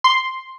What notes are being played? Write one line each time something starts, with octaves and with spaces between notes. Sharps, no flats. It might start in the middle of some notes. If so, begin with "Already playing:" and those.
C6